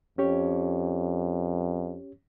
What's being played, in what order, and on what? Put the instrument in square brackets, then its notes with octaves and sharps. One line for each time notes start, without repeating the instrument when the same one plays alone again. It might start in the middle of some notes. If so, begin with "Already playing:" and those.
[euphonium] F2 [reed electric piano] C#4 G4 C#5